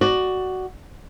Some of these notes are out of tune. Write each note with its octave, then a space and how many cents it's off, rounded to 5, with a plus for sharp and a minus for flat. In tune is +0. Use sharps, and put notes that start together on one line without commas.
F#4 +10 D5 +15